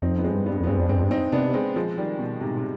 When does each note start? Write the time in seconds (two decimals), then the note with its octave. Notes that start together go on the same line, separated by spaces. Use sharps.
0.02 F2 C4 D#4
0.18 B3
0.24 G#3 C4
0.31 G2
0.46 G3 B3
0.60 F2
0.64 B3
0.67 G2 G#3 C4
0.77 F2 D4
0.89 G2 G#3 C4
0.97 F2
1.03 G2
1.11 C4 D#4
1.32 C3 B3 D4
1.54 G#3 C4
1.76 F3 G#3
1.97 D#3 G3
2.19 B2
2.41 G#2 C3
2.57 C3